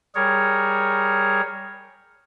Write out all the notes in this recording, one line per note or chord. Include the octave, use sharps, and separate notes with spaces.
G3 G#4 A#4 C#5